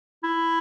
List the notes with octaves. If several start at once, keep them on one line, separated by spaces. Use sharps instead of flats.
E4